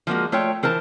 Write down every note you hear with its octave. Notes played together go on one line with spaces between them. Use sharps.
F3 G#3 A#3 F#4
A3 F4 C#5 G5
E3 A#4 C5 A5